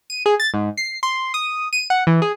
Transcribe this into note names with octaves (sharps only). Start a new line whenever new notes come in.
D#7
G#4
A6
G#2
C7
C6
D#6
D#7
F#5
E3
G#4